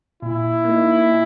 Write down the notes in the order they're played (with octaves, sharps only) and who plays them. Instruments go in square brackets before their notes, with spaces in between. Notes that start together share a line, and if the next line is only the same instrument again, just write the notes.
[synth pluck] A#2 [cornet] E4
[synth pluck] A#3 D#4
A#2